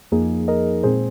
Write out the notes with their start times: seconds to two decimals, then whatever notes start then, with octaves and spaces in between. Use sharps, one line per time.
0.12 F2 F3 A#3 D#4 G#4
0.48 A#4 D#5
0.83 A#2 G#3 C4 G#4 C5